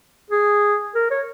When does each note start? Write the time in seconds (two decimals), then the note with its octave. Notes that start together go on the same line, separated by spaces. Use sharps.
0.31 G#4
0.95 A#4
1.11 C#5